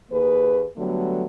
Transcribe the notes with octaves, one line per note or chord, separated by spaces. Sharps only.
D#2 A#3 G#4 B4
D3 F#3 G3 A3 B3